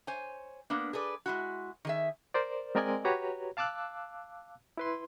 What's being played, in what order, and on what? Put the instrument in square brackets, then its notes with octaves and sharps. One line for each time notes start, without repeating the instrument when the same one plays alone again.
[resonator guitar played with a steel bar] C5 C#5 G#5
A#3 B3 D4
G#4 A4 B4 D5
G#3 E4 F#4
D#3 G#4 E5
[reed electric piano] A#4 C5 D5
G#3 C4 A#4 D5 D#5 G#5
F#4 G4 B4 C#5 A#5
F5 A5 D6 E6 F#6
E4 B4 C6